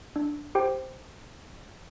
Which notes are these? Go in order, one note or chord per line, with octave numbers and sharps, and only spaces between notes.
D4
G4 C5 G5